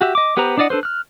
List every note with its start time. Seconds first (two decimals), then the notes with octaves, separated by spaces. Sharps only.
0.01 F#4 G4 E5
0.15 D#5 D6
0.37 B3 G4 B4 C5 A#5
0.57 D4 E4 D5 D#5 F#5
0.70 D4 A4 B4 C5
0.83 F6 F#6